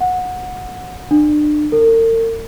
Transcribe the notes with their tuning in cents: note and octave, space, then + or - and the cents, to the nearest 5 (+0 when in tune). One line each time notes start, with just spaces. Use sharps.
F#5 -20
D4 +35
A#4 -45